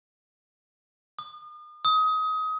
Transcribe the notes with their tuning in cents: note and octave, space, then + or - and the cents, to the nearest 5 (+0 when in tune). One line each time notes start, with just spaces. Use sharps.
D#6 -40
D#6 +25